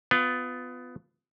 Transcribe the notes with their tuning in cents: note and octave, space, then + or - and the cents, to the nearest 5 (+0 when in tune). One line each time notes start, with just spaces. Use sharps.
B3 +20 F4 +0